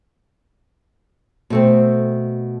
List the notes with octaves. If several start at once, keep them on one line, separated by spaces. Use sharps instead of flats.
B2 A3 C4